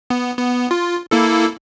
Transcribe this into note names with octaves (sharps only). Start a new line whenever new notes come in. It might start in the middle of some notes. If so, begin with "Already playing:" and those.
B3
B3
F4
A#3 E4 A4